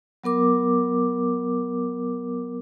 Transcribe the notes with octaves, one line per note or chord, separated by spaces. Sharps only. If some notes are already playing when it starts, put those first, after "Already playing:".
F#3 B3 A#4 D6